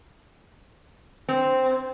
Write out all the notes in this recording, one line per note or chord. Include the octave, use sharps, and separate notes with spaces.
C4